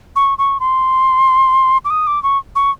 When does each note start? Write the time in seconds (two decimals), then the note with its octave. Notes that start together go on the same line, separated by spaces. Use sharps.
0.16 C#6
0.38 C#6
0.60 C6
1.85 D6
1.90 D#6
2.07 D6
2.23 C#6
2.56 C#6